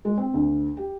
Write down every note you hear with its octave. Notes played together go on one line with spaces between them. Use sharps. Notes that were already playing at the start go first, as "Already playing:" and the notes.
G#3
C4
D2
G4